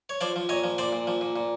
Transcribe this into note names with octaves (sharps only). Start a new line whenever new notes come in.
C#5
F3 C5 D5
F3
A#2 C#5 D#5
F3
A#2 C5 D5
A#2
F3
A#2
A#2